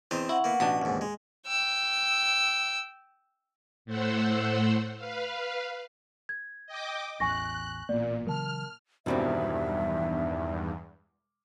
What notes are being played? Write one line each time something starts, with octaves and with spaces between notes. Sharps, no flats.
E2 C4 D#5
E4 F#5 C#6
A#3 B3
A1 B2 D4 D#6
D#2 G#2
G#3
G5 E6
A2 A3 C5 F#5 E6
B4 F5
G#6
D#5 G5 D6
A1 E2 G#5 C#6 F#6 A#6
A1 A#2 A#3 B3 D5
C#3 E3 F#3 A#4 A5 F6
E1 E2 G2 B2 D#3 G3 C4 E5